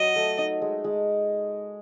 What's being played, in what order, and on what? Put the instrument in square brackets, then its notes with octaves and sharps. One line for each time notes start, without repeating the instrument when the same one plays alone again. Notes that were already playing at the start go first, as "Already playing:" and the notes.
Already playing: [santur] F#3 [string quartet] D#5
[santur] A3
D#4
G#3
G#3